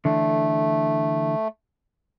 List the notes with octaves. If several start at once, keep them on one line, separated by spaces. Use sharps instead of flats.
D3 E3 A3 D4